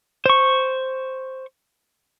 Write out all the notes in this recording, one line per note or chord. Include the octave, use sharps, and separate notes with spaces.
C5 C#6